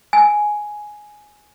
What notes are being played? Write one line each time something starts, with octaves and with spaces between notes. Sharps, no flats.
G#5